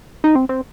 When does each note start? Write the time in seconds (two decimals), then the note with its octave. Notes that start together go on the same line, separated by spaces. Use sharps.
0.24 D#4
0.35 C4
0.49 C4